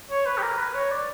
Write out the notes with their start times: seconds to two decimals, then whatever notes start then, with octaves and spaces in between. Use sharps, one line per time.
0.10 C#5
0.26 B4
0.38 G4
0.42 A#4
0.58 B4
0.75 C#5
0.91 D5